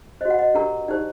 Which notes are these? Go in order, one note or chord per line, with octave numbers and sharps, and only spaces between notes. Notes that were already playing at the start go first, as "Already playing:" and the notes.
F#4 C5 D#5 F#5
D#5
D4 G4 A#4 A#5
D#4 G4 C5 D5